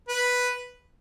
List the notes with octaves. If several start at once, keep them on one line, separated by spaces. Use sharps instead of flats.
B4